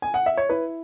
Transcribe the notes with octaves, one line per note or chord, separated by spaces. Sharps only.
G#5
F#5
E5
C#5
E4 B4